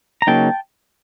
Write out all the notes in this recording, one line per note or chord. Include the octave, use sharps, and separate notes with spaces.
A#5
C#3 F#3 A#3 D#4 G5 A5